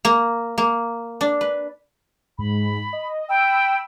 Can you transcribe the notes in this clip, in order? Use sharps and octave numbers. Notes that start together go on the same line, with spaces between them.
A#3
A#3
D4
B4
G#2 B5
D#5
G5 B5 E6